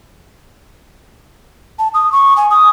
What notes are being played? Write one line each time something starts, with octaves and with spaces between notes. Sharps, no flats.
A5
D#6
C#6
G#5
D#6